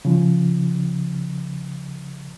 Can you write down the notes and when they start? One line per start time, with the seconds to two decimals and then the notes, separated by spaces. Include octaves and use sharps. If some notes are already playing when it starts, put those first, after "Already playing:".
0.05 C#3 F3